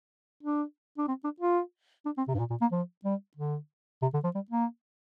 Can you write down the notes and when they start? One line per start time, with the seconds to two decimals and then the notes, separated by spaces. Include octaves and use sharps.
0.43 D4
0.98 D4
1.08 C4
1.24 D4
1.40 F4
2.06 D4
2.18 C4
2.28 C3
2.34 G2
2.39 A#2
2.50 A#2
2.61 A#3
2.72 F3
3.05 G3
3.37 D3
4.02 C3
4.14 D3
4.24 F3
4.35 G3
4.51 A#3